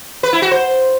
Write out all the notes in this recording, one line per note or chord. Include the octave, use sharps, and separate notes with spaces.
B4
E4
F#4
C5